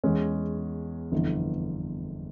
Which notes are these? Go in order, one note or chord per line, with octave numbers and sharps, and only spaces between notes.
E2 E3 G#3 C#4
G1 F2 E3